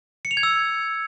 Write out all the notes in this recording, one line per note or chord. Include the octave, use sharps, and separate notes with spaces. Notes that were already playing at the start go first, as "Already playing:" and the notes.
C#7
F7
G#6
E6